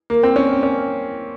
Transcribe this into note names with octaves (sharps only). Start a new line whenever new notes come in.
A#3
C4
C#4
C#4